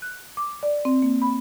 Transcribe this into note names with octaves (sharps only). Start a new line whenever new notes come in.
F#6
D6
D5
C4
A#3
B5